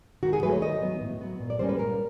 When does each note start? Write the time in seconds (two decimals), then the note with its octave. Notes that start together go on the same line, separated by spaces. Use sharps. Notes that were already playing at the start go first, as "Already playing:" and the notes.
0.23 D#3 F#4
0.33 G#4
0.43 F#3 A3 B4
0.52 C#5
0.62 D#3 D#5
0.82 F#3 B3
1.01 A2
1.21 F#3 B3
1.40 A#2
1.50 D5
1.59 G3 A#3 C#4 C5
1.69 B4
1.78 A#2 A#4